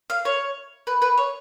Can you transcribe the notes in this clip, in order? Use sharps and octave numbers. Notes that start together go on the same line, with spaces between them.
F5
C#5
B4
B4
C#5